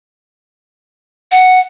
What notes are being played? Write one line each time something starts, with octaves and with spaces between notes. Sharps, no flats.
F#5